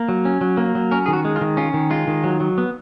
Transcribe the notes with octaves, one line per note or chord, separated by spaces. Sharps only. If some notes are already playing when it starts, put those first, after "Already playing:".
Already playing: A#3
F#3
C#4
F#3
A#3
F#3
C#4 A#4
D#3 G#4
F#4
G#3
F4
D#3
C#4 F4
D#3
G#3 F4
D#3
F#3
F#3
B3